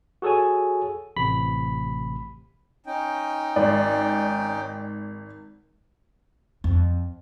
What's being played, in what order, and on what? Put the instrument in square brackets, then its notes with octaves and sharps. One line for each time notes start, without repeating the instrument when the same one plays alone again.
[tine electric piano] F#4 G#4 A4 C#5 G#5
A1 C3 B5 B6
[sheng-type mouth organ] C#4 D#4 G5
[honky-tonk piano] G#1 D5
[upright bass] F2